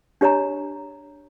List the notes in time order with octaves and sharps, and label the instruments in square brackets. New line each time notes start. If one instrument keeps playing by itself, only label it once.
[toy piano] D4 G4 C#5 D#5 A#5